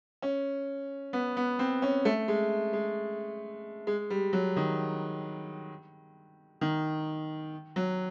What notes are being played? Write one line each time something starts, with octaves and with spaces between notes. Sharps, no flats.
C#4
B3
B3
C4
C#4
A3
G#3
G#3
G#3
G3
F#3
D#3
D#3
F#3